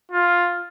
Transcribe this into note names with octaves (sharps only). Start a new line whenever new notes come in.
F4